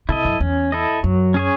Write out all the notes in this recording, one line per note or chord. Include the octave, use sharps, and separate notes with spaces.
C3 E4 A4 D#5
F#2
E2 C#4
E4 A4 D#5
F#2 F#3
C#4 G#4 C#5